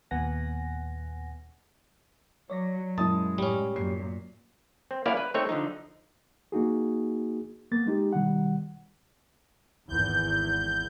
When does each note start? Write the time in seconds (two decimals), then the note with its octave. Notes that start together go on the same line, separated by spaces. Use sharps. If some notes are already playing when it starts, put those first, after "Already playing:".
0.11 D#2 A#2 B3 F#5 G#5 A#6
2.50 F#3 C#5 D5 A#6
2.98 F#2 A#2 G#3 E4 A5 D#6
3.38 A2 G3 C#4
3.76 F#2 A#2 C7
4.91 C4
5.06 A#3 B3 C#4 E4 D5 F5
5.17 B4
5.34 A3 C4 D#4 C#5 E5
5.49 D3 F3 D#4
6.52 A#3 D#4 F#4 G#4
7.72 A#3 B3 A6
7.86 G#3 D#4 G4
8.13 B2 D#3 G3 F#5
9.89 G#1 E2 G6